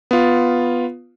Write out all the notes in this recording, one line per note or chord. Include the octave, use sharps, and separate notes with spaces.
B3 F4